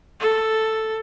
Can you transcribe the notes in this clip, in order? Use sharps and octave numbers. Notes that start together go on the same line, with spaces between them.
A4